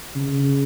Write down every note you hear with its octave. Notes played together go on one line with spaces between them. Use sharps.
C#3